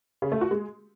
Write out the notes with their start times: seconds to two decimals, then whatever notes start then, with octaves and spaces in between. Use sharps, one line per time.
0.22 C#3
0.32 A3
0.41 F#4
0.51 G#3